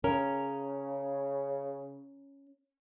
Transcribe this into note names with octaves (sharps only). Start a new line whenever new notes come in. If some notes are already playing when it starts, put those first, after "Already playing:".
C#3 C#4 A#4